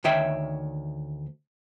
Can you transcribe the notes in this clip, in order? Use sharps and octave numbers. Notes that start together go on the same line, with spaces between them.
D2 D#3 C#5 E5 G5